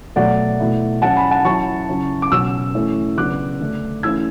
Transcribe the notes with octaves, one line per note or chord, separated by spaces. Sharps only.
B2 F#3 A3 D5 F#5
B2 A3 E4
F#3 C#4 E4 F#5 A5
G#5 B5
F#5 A5
F#3 C#4 E4 A5 C#6
C#3 F#3 C#4 E4
D6
B2 F#3 C#4 C#6 E6
E3 A3 C#4 E4
C#3 F#3 B3 D4 D6 F#6
D3 A3 D4
E3 A3 C#4 E4 E6 G#6